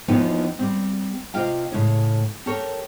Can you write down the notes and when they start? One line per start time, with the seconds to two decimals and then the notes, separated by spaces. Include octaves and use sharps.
0.08 D#2 E3 F3 B3 D#4 G5
0.59 G3 C4
1.34 C3 F4 D#5 F5 G5
1.72 A2 C#3
2.46 G4 A4 A#4 C#5